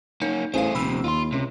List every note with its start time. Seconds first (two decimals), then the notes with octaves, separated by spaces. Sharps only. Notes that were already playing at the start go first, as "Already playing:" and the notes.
0.22 A#3 C#4 D#4
0.54 A1 A3 G#4 C5 F5
0.75 D#1 C3 F3 B5 E6
1.04 D#2 F4 C6
1.32 C#2 C3